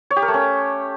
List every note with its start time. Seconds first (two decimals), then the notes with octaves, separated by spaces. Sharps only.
0.10 C#5
0.16 G4
0.22 A#4
0.28 A3
0.34 C#4